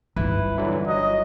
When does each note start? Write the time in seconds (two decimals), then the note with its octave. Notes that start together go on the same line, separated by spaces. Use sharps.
0.16 G1 D#4 E4 B4
0.58 D3 E3 F#3
0.88 F#3 D#5